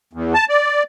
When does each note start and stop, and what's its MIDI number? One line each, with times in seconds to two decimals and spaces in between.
0.13 0.34 40
0.34 0.45 81
0.49 0.83 74